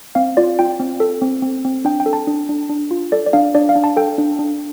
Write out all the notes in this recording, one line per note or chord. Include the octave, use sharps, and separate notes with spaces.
C4 F5
F4 D5
F4 G5
C4
A4
C4
C4
C4
D4 G5
G5
A4
A5
D4
D4
D4
F4
A4 D5
D5
D4 F5
D4 D5
F5
D4
A5
A4 G5
D4
D4